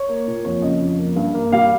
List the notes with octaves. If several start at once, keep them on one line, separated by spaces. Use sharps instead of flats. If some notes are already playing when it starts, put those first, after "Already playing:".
Already playing: C#5
A#3
A#2
F2 C#5
C#3 D#5
F2
A#3
G2
A#3
G3 F5